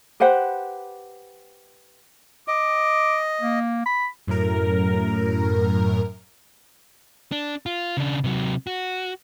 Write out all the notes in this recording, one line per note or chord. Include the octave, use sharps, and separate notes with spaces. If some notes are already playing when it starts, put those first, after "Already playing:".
G4 B4 C5 F#5
D#5 D6
A#3
B5
F#2 A2 A#4
D4
F4
C#3 D4
C3 F#3
F#4